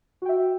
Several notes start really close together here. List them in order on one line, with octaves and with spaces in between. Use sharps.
F#4 G5 E5